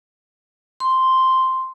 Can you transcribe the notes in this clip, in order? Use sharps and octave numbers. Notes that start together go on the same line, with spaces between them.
C6